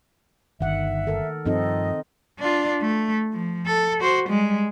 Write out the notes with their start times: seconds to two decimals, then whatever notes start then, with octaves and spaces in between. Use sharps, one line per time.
0.61 G1 D#3 E5 F#5
1.07 A4 A#4
1.46 G2 F3 C4 D#4 A4 D#5
2.39 D4 F4
2.81 A3
3.33 F3
3.66 A4
4.00 F#4 C5
4.29 G3 G#3